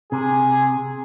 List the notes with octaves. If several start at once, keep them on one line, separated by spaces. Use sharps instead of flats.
C3 G#4